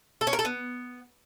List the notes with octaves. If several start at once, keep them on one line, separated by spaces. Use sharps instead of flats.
A4
C#4
A#4
A4
B3